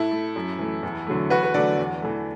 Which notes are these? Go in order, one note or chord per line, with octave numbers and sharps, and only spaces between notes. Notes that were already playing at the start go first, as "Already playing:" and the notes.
Already playing: A2 E4 A4
A3
F#2
E3 A3
E2
D3 F#3 A3
E2 F#4 B4
B4
D3 F#3 A3 A4 D5
E2
E3 A3